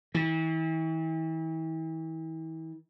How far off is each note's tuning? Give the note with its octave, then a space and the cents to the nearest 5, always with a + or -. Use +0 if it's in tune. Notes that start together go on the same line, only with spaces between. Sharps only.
E3 -40